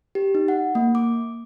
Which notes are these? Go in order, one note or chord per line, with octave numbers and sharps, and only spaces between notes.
G4
D#4
F#5
A#3
D6